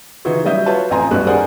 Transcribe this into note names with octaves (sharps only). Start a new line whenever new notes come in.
C#3 E3 D#4 F4 F#4
F#3 G3 D#5 E5 G6
F4 F#4 B4 C#5 F5 A5
A1 F2 G#5 A#5 C6
B1 F#2 B2 G3 F#4 F#6
G#4 A#4 C5 D5 F#5 G#5